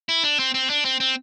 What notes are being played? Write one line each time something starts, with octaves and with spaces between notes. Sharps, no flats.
E4
D4
C4
C4
D4
C4
C4